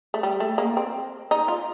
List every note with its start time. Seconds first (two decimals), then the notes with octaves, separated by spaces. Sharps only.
0.14 A3
0.23 G3
0.40 A3
0.58 A#3
0.77 C4
1.31 D#4
1.48 F4